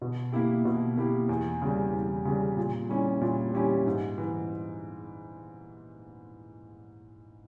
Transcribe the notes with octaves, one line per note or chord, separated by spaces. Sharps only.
B2
A#3 E4 G4
B2
A#3 E4 G4
E2
C#3 G3
E2
C#3 G3
A#2
G3 C#4 E4 G4
A#2
G3 C#4 E4 G4
G#2
E3